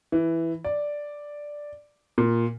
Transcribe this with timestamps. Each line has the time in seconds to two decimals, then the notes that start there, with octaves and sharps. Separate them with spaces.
0.12 E3
0.64 D5
2.18 A#2